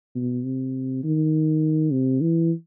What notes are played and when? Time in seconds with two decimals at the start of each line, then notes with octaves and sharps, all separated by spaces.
0.15 B2
0.44 C3
1.03 D#3
1.91 C3
2.21 E3